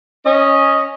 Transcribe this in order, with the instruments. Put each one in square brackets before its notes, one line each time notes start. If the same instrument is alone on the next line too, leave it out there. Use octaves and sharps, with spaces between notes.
[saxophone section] C#4 D#5